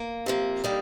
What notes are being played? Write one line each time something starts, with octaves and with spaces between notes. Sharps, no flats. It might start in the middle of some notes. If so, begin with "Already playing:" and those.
Already playing: A#3
C3 F3 A#3
D3 G3 A#3 D#4